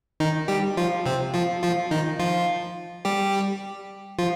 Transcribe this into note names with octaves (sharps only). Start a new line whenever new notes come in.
D#3 D#4
G3 G4
F3 F4
C3 C4
F3 F4
F3 F4
D#3 D#4
F3 F4
G3 G4
F3 F4